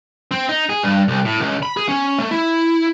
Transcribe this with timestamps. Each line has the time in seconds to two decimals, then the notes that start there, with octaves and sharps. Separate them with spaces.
0.31 C4
0.49 D#4
0.69 G#4
0.83 G2
1.08 C2
1.25 A2
1.40 C#2
1.63 B5
1.77 G#4
1.89 C#4
2.19 A3
2.31 E4